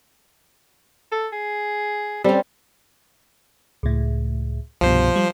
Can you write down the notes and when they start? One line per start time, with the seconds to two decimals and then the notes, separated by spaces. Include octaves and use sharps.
1.12 A4
1.32 G#4
2.24 G3 C4 C#4 A4
3.83 C#2 A2
4.81 C2 G2 B2 F3 C5
5.16 G3